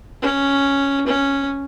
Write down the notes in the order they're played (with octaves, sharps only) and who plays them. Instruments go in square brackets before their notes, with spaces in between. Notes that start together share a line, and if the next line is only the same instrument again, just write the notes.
[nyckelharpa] C#4
C#4